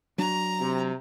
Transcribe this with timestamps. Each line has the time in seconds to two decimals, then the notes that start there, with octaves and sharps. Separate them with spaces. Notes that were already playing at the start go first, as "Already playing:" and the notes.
0.18 F#3 D4 A#5
0.60 C3